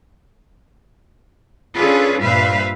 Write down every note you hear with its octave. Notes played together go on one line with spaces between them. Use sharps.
C#4 D4 F4 G#4 A4 B4
G2 A#2 B4 C5 E5 F5